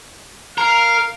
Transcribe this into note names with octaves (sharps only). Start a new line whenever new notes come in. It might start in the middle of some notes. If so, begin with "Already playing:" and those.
A#4 F5